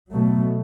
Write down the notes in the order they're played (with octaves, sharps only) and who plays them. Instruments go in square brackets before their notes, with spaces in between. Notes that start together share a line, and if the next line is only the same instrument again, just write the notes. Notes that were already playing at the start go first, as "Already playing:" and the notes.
[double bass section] B2 F#3 A3